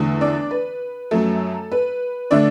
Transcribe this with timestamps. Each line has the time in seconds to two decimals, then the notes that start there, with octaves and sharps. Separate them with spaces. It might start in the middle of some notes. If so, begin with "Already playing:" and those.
Already playing: E2 D3 A3
0.21 D4 D5
0.51 B4
1.11 F#2 F#3 A3 A4
1.72 B4
2.31 D3 A3 D4 D5